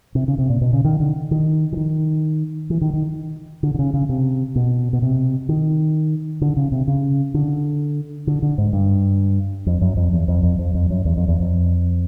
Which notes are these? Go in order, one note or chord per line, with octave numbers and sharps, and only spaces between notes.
C3
C#3
C3
A#2
B2
C#3
D#3
D3
D#3
E3
D#3
E3
D#3
D#3
D3
D3
C#3
C#3
C3
B2
B2
C3
D#3
D3
C#3
C3
C#3
D3
D3
D3
G#2
G2
F2
F#2
F2
E2
F2
F2
F2
F2
F#2
E2
F2
E2
F2